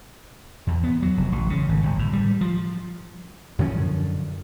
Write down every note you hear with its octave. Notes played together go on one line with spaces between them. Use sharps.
E2
B3
F#3
F1
A1
C#3
G#1
G1
A2
G3
F3
F#2 D3 F3 C#4